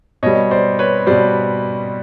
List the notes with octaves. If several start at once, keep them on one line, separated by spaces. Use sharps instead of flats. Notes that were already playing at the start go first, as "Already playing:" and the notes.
B2 G3 C#5 D#5
C5 D5
B4 C#5
B2 G3 C5 D5